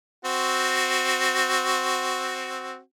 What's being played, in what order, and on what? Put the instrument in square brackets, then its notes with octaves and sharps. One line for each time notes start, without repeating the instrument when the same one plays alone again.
[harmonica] C4 F#4